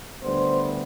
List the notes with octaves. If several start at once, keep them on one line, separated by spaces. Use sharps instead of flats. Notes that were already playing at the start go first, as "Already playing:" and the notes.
D2 D3 G3 B3 C5